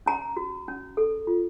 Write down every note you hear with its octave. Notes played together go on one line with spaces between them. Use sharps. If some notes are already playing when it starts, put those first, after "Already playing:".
C#4 A#5
F#4
C#4
A4
F4